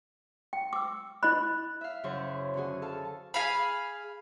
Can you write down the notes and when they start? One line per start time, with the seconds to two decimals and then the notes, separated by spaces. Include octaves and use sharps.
0.53 G5
0.73 D6 E6
1.23 E4 D#5 B5 F#6
1.81 E5 F5
2.04 F#2 C#3 F#3 E4 C5 C#6
2.54 D3 C#4 F#4 G#4
2.82 A4 F5 A5
3.34 G#4 F5 B5